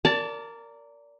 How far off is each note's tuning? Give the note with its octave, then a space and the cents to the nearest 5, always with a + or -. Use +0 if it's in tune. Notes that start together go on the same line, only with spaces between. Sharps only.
A#4 -10 D5 -20 A5 +20